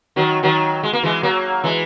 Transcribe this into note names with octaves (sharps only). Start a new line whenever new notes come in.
D#3 F#3
D#3 F#3
G#3
A#3
E3 G#3
F#3 A#3
E3 G#3